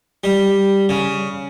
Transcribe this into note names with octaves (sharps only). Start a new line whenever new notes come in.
G3
C#3